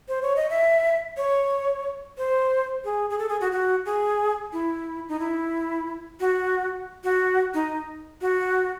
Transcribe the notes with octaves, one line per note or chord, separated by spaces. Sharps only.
C5
C#5
D#5
E5
C#5
C5
G#4
G#4
A4
G#4
F#4
F#4
G#4
E4
D#4
E4
F#4
F#4
D#4
F#4